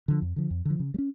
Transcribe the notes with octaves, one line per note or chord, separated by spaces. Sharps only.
D3 F3
F2
D3 F3
F2
D3 F3
C#3
G3
C#4